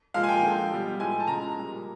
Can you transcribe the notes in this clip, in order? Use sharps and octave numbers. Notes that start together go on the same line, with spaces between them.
A#2 F3 G#3 F5
G#5
G5
D3 F3 G#3
B2 G3
A2 F3 G#3 G#5
A5
C#3 F3 G#3 A#5
A#2 G3